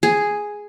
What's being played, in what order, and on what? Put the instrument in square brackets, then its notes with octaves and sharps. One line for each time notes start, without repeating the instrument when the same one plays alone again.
[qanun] G#4